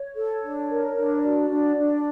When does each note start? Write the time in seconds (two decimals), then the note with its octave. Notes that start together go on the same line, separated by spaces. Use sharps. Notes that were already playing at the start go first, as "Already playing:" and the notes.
Already playing: C#5
0.16 A4
0.42 D4
0.69 A#4
0.96 D4
1.16 C#5
1.22 F#4 D5
1.50 D4
1.77 D4